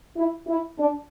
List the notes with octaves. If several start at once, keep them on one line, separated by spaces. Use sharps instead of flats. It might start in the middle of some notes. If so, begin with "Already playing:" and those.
E4
E4
D4